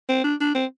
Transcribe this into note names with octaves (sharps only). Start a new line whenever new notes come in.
C4
D4
D4
C4